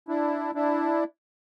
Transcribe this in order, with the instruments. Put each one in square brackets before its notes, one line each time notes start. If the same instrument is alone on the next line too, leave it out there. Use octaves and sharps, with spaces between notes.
[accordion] D4 E4
D4 E4